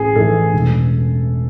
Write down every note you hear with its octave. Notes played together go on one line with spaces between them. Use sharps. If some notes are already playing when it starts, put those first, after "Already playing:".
Already playing: A1 G#4
A2 E3 A4
E1